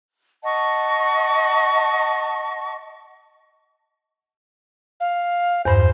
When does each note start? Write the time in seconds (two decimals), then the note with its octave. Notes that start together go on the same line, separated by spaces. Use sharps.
0.43 D#5 F#5 A5 C#6
5.00 F5
5.65 E2 G2 C5